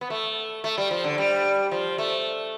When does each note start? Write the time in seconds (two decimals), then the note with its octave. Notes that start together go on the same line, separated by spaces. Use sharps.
0.01 B3
0.10 A3
0.64 A3
0.78 G3
0.91 F3
1.04 D3
1.18 G3
1.72 F3
1.98 A3